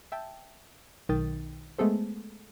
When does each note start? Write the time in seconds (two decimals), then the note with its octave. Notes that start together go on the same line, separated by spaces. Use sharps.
0.12 E5 G5 A5
1.09 B1 D#3 G5 D#6 A6
1.79 G#3 A3 B3 G#4 A4 C5